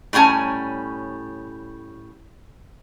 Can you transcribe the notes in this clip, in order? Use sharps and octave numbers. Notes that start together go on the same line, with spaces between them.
A2 G3 C#4 G#5 A#5